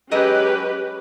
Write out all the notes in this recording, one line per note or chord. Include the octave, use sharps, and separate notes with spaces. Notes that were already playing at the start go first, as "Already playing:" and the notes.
F#3 G#3 C#4 G4 B4 D#5